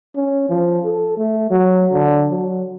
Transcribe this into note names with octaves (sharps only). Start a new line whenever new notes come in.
C#4
F3
A4
A3
F#3
D3
F#3